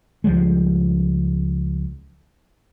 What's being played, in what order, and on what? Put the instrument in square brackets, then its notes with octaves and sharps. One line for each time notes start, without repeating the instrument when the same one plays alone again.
[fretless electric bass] C#2 F3 G3 G#3